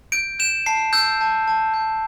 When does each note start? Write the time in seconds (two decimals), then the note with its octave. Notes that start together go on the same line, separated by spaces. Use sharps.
0.12 G6 D7
0.39 G6 E7
0.66 A5 C7
0.93 E6 G6
1.21 A5
1.48 A5
1.74 G6